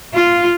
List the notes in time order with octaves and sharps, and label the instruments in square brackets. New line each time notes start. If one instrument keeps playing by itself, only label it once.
[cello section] F4